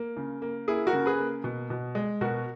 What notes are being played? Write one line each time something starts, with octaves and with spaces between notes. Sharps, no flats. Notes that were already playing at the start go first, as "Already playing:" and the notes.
Already playing: A#3
C#3
A#3
A#3 E4 G#4
F#4 A#4
C#3
G#4 B4
A#3
B2
B2
G#3
B2 F#4 A#4